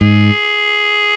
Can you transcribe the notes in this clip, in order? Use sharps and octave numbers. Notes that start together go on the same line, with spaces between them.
G#2 G#4